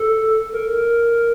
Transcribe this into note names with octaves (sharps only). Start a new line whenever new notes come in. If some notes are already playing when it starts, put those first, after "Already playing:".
Already playing: A4
A#4